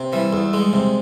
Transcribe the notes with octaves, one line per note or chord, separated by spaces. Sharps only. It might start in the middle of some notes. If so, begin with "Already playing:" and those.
Already playing: C3
E3 G3
E2
G#3
C3